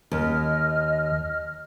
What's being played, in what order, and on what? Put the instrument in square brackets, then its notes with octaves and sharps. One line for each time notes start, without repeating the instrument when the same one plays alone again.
[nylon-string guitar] D#2 [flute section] D#5 F6